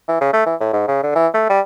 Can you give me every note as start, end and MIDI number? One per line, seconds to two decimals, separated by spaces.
0.08 0.21 52
0.21 0.32 49
0.33 0.43 57
0.46 0.55 52
0.61 0.71 45
0.73 0.85 44
0.88 1.02 49
1.03 1.14 50
1.16 1.28 52
1.34 1.47 57
1.50 1.61 55